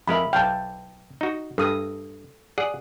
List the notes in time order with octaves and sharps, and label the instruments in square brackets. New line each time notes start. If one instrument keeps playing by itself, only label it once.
[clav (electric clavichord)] F2 G#3 A#4 [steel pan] E5 B5
[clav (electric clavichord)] B1 F5 [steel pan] G5 A5
[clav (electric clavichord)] D#4 F#4
[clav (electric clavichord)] G2 [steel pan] A4 D#6
[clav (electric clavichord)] G#4 D5 F#5